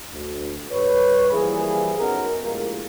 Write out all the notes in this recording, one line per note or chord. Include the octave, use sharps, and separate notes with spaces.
D2
G2 B4 C#5
E3 F3 G3 A#3 E4 G#4
B3 C#4 D#4 F#4 A4 A#4
A#1 A2 G#3 F4 G4 A#4